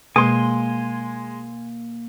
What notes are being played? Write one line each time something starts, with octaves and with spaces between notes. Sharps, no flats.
B2 G#3 A#3 G#5 C6